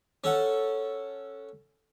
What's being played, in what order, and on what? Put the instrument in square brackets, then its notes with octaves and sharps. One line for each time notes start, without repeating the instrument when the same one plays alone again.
[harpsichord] C#4 A4 F#5